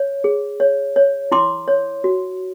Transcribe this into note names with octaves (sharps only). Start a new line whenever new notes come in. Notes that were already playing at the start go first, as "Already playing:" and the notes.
Already playing: C#5
G#4
C#5
C#5
E4 C6 D6
C#5
F#4